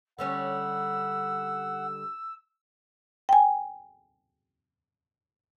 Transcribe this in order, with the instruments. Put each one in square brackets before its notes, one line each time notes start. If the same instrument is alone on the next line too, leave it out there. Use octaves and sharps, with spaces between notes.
[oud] D3 G3 C#4 [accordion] F#5 [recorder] E6
[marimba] G5 G#5